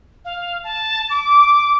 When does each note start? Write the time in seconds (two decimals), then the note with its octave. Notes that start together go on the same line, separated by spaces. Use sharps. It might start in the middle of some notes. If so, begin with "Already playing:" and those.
0.25 F5
0.64 A5
1.10 D6